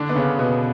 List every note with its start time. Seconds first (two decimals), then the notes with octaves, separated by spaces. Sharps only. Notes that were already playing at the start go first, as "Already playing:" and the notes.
Already playing: D3 D4
0.09 B3
0.15 C#3 C#4
0.38 B2 B3